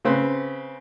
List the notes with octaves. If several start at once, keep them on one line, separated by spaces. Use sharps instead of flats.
C#3 C4 B4